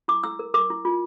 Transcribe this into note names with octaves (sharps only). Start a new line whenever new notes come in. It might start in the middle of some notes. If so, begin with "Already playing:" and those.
E4 D6
E4 E6
A#4
A#4 D6
E4
F4